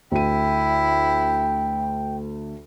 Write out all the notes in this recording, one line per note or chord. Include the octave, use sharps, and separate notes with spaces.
D2 E4 G5 D#7